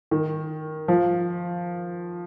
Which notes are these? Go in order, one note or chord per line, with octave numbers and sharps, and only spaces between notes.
D#3
F3